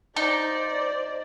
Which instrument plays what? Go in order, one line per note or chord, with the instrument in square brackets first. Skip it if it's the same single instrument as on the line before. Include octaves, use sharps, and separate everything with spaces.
[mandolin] D#4 [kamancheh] C5 D5